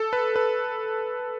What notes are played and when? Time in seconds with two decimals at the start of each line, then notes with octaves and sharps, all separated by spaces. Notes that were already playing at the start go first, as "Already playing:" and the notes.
Already playing: A4
0.13 B4
0.36 B4